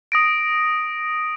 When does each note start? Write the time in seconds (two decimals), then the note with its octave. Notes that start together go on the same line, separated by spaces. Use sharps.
0.12 D#6 A#6 D7